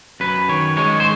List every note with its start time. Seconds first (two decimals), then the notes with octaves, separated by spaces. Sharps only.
0.20 F#2 B4
0.49 D#3 C#5
0.77 G#3 C#5
1.00 C5